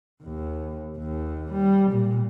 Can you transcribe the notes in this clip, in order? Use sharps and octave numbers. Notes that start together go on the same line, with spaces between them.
D#2
D#2
G3
A#2